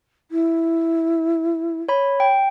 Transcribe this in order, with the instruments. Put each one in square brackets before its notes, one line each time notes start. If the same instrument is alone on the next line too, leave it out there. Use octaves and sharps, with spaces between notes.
[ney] E4
[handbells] C#5 B5
G5